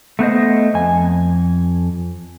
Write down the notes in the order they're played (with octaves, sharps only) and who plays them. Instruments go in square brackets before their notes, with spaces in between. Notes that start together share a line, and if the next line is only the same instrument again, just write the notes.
[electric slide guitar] A3 B3 C5 D#5
F2 G#5